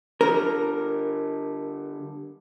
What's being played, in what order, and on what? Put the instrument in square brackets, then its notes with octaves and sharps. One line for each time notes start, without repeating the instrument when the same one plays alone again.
[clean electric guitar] D3 G3 [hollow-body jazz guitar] A#4